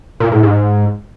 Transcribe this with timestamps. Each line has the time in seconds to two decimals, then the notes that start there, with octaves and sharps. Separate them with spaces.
0.20 A#2
0.32 A2
0.43 G#2